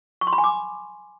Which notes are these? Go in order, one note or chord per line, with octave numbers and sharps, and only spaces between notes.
C#6
C6
B5
G#5
D6